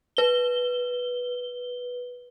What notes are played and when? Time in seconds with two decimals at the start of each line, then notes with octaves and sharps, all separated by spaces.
0.17 B4 G7